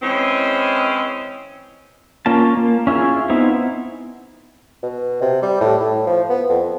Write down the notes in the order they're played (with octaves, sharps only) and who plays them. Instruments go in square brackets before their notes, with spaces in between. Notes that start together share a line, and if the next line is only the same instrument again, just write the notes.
[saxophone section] E3 G#3 C4 C#4
[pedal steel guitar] A#3 C#4 F4 A5
A#3
C#4 E4 F4 G#4
B3 C4 D#4 E4
[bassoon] B2
C3
G3
A2
A2
F3
B3
F2